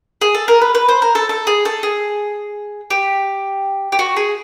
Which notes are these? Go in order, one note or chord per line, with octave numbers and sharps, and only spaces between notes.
G#4
A4
A#4
B4
B4
C5
A#4
A4
A4
G#4
A4
G#4
G4
G4
F#4
G#4